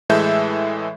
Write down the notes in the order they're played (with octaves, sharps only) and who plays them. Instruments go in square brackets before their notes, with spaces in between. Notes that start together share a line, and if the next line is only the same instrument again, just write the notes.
[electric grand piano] A2 E3 G#3 A4 E5 G6